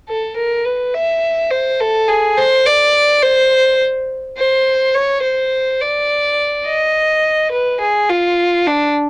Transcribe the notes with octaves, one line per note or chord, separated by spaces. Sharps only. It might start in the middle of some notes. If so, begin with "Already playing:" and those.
A4
A#4
B4
E5
C5
A4
G#4
C5
D5
C5
C5
C#5
C5
D5
D#5
B4
G#4
F4
D4